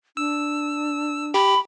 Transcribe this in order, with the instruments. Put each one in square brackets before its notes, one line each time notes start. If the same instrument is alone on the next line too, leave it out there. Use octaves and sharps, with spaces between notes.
[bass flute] D4 [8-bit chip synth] E6
[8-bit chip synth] G4 [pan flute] B5